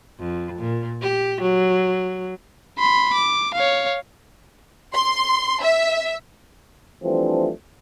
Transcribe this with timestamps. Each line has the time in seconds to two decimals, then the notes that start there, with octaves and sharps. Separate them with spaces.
0.19 F2
0.59 A#2
1.01 G4
1.41 F#3
2.79 B5 C6
3.14 D6
3.55 C#5 F5
4.94 C6
5.63 E5
7.04 E3 F3 G3 A3 C4 D4